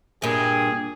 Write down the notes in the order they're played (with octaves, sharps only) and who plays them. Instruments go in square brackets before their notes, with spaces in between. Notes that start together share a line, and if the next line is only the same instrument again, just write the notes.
[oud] G2 A#2 [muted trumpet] G#4